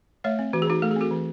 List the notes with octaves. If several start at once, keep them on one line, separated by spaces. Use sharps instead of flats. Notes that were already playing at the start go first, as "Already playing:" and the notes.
A3 C#5 E5
C4
E3 F#4
G#4
E3 D#4 F#4
A3 A4
G#4
C4 F#4 A4
E3